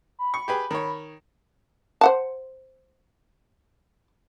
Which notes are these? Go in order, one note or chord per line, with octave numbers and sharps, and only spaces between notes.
B5
C#6
G4 G#4 B4
D#3 C#5
C5 F#5 A5